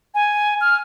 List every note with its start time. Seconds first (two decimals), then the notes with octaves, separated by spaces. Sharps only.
0.15 G#5
0.61 F6